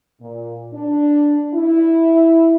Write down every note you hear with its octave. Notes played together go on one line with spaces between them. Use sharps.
A#2
D4
E4